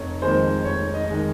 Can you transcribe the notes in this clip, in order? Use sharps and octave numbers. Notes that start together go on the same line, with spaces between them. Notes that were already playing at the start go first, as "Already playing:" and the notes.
Already playing: F1 C#5
F2 D#3 G#3 C5
F1 C#5
D#5
D#3 G#3